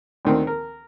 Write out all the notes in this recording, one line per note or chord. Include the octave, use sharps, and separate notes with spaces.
D2 D#3 C4
A#4